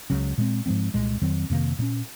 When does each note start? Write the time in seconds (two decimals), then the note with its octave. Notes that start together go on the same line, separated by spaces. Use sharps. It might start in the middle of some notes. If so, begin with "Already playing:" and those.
0.10 C#2 C#3 F#3 C#4
0.38 A#2 G#3 C4
0.66 G#2 F3 G#3 C4
0.94 C2 A#2 G#3
1.22 F2 D#3 F#3 C4
1.50 F2 C3 D#3 A#3
1.79 A#2 G#3 C#4